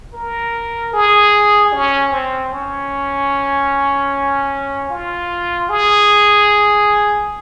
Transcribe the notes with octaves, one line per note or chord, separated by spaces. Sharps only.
A#4
G#4
C#4
C4
C#4
F4
G#4